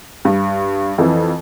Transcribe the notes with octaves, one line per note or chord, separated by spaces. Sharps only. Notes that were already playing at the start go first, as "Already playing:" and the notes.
G2
F2 E3